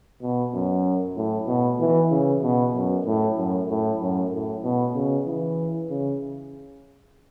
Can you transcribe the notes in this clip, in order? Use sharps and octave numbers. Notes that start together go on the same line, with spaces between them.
B2
F#2
A2
B2
E3
C#3
B2
F#2
A2
F#2
A2
F#2
A2
B2
C#3
E3
C#3